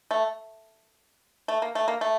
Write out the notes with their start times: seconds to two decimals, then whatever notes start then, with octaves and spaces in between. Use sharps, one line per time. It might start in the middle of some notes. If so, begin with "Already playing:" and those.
0.11 A3
1.48 A3
1.62 A#3
1.75 A3
1.88 A#3
2.01 A3